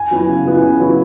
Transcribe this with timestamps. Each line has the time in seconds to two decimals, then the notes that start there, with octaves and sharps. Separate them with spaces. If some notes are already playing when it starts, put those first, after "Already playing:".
Already playing: G#5
0.11 F#3 B3 E4
0.28 C#3
0.46 F#3 B3 E4
0.62 C#3
0.80 F#3 B3 E4